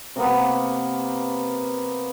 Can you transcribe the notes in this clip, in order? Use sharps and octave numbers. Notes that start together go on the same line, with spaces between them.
C3 A#3 B3